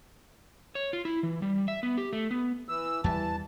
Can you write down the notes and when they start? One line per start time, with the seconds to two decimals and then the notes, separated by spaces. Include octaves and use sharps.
0.75 C#5
0.93 F4
1.05 E4
1.23 E3
1.42 G3
1.68 E5
1.83 B3
1.98 G4
2.13 A3
2.31 B3
2.69 E3 E6
3.04 E2 E3 G3 A5